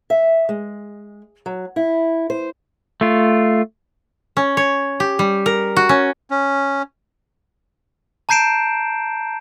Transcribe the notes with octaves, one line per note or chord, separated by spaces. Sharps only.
E5
G#3
F#3
E4
C5
A3 F4
C#4
C#5
G4
G3
A#4
F#4
C#4
C#4
A5 A#5 G6 C7 D7 E7